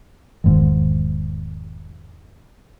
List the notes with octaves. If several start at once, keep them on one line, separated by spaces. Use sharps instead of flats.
E1 G#2 D#3